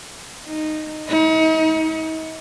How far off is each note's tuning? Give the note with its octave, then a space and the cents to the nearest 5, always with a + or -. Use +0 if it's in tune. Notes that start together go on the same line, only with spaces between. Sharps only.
D#4 -10
D#4 +40